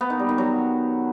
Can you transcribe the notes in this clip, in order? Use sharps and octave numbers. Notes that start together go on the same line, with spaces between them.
B3
D#3
G3
D#3
F#3